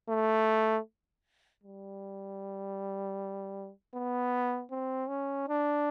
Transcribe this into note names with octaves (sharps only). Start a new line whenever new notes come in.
A3
G3
B3
C4
C#4
D4